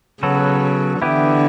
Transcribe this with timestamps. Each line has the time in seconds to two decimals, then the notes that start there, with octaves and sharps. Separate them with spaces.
0.23 C#3 F#3 B3 F#4 A4
1.02 D3 E3 B3 E4 G4